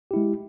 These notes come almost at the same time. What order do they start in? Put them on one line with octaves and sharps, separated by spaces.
G4 E4 G#3